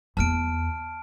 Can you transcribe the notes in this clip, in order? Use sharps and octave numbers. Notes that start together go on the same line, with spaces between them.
E2 B3 A5 F6 D7